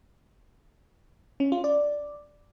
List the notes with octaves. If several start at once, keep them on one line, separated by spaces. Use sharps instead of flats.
C#4
F4
D5